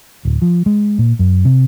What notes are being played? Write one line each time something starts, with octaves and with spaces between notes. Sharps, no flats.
D1
F3
G#3
A#2
F#2
C3